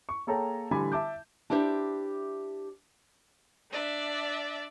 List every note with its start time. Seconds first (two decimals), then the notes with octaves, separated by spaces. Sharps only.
0.09 C#6
0.27 A#3 G#4 A4 C#5 G5 A#5
0.71 A1 D3 G3 G#5 B5 D6
0.92 E5 A5 D6 G6
1.50 D4 E4 G4 C5 D5 E5
3.71 D4 D5 E5